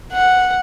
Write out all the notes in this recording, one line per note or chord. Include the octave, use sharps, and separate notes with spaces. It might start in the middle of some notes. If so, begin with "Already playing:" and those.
F#5